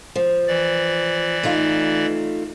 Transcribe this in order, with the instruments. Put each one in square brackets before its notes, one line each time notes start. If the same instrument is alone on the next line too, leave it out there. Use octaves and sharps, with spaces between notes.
[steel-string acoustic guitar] F3
[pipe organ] E3 D5
[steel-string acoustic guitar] A3 D#4 F4